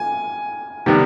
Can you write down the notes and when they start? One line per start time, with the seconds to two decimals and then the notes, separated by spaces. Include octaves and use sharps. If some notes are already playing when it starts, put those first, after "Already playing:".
Already playing: G#5
0.86 C3 D#3 G3 B3